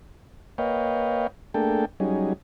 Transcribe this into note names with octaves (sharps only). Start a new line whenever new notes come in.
A#3 B4 C#5 D#5 F5 G5
A3 A#3 D4 G#4 A4 G5
F#3 G3 C#4 D#4 G#4